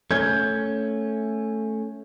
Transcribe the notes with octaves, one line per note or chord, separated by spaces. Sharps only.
A3 C#4 G6 G#6